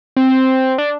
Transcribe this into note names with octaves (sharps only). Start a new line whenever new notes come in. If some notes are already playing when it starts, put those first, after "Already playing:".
C4
D4